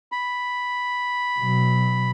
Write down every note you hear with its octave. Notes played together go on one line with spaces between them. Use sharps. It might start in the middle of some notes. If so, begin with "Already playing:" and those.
B5
B2 F#3